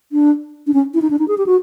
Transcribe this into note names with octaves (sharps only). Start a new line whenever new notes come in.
D4
D4
C#4
E4
D#4
D4
D#4
G#4
G4
F#4